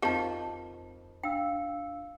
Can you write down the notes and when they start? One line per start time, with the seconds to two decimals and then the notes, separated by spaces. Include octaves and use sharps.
0.02 F2 D#3 F3 G4 A5
1.23 D4 F5 G5 E6